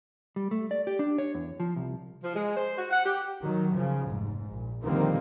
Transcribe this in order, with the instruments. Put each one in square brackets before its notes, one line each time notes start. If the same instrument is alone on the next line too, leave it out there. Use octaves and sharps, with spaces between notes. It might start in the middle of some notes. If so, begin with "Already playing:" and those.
[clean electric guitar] G3
A3
D5
G4
D4
C#5
E2
F3
C2
[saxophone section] F3
G#3
C5
F#4
F#5
G4
[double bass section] D#3 F#3
C#3 F3
F1 G#2
A#1
D3 D#3 F3 G3 A#3 C4